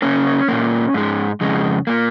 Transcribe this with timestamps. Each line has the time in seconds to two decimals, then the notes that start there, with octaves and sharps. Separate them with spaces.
0.02 C#3 A#3 C#4
0.48 A#2 A#3
0.94 G#2 G#3
1.41 F2 C#3 G#3
1.87 A#2 A#3